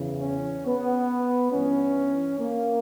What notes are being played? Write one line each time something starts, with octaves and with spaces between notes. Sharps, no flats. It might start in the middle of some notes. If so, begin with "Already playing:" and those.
Already playing: E2 C#3 E3
C#4
B3
G2 E3 C#4
A#3